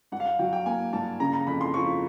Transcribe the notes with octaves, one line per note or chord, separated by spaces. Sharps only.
G2 F#5
F5
F#5
F#3 G5
G5
A#3 G#5
G2 A5
C#3 A#5
A#5
F2 B5
C6
F3 C#6